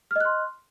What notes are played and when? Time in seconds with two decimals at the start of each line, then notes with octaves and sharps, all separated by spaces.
0.11 F6
0.16 D#5
0.20 F#6
0.25 C6